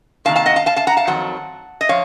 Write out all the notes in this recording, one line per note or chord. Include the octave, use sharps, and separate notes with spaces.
C3 D#3 A#3 F5 A5
F5 A5
D#5 F#5
F5 A5
F5 A5
F5 A5
F#5 A#5
F5 A5
F2 D#3 F#3 F#5
D#5
F3 C#5 F5